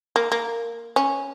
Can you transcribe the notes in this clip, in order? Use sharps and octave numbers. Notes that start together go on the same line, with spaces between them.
A#3
A#3
C#4